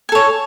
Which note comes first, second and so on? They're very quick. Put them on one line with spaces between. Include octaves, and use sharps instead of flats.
G#5 A4 C#5